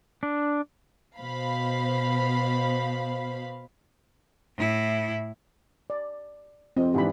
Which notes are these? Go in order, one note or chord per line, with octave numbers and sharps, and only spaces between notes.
D4
B2 C5 F5 B5
A2 E4
D5
F2 C4 D#5
G#2 E3 D4 G4 B5